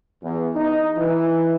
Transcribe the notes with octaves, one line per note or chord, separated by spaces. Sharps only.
E2
D#4
E3